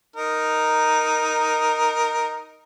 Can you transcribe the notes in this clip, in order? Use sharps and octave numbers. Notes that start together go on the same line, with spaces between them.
D#4 A#4